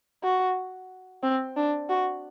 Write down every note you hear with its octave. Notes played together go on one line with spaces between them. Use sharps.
F#4
C4
D4
F#4